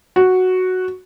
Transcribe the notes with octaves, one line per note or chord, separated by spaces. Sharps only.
F#4